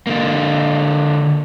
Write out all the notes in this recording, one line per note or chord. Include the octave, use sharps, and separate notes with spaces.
D3 A#3